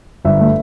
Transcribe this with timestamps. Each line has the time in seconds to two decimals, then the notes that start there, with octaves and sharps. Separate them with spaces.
0.25 G1 E5
0.40 A3